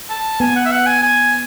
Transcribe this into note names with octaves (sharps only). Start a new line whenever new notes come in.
A5
B3 G#5
F#5
E5
F#5
G#5
G#5